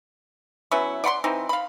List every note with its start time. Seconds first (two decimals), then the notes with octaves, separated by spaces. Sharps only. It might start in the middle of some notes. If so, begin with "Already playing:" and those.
0.71 F#3 B3 C#4 E4
1.04 D5 F#5 B5 C6
1.24 E3 C4 D#4
1.49 F5 B5